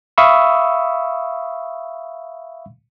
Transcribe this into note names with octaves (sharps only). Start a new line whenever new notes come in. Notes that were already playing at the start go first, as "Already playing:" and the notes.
E5 F5 B5 C#6 D#6 E6